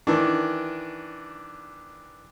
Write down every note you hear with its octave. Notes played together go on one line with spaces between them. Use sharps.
D#3 E3 D4